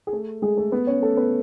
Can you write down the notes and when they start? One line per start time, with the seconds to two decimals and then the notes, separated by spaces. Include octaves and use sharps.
0.07 G#4
0.13 A3 A4
0.42 G#3 G#4
0.57 A3 A4
0.72 B3 B4
0.87 C#4 C#5
1.02 A3 A4
1.17 B3 B4